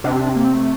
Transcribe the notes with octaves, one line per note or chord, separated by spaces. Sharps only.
C3 D4
C4
D4
C4
A#3
C4
A3